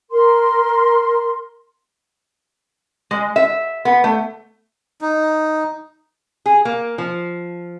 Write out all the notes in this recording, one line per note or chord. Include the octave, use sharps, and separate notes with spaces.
A#4 C6
G#3
E5
B3
A3
D#4
G#4
A#3
F3